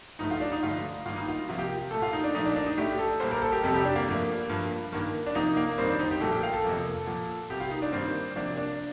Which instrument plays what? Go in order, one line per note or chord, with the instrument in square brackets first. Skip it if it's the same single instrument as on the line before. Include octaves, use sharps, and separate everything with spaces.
[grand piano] G2 F3 A3 D#4
F4
D4
D#4
G2 D3 F3 A3 F4
G2 D#3 G3 A#3 F4
D#4
F4
C3 F3 A#3 F4
G4
A#2 A3 A4
F4
D#4
D4
A#2 F3 A3 D#4
D4
D4
D#4
A2 A3 G4
A4
A#2 G3 A#3 C5
A#4
A4
G4
F2 C3 G3 A4
G4
D4
A#3
G2 F3 A3
G2 F3 A#3
G2 D#3 A#3
D4
C3 F3 A#3 D#4
A#3
F2 D#3 G3 C4
D4
D#4
G4
A#2 F3 A3 A4
G5
F5
A4
F2 C3 F3 A#3
A#2 F3 A#3
C3 G3 A#3 G4
F4
D#4
D4
G2 D#3 G3 A#3 C4
C3 F3 A#3 D4
D4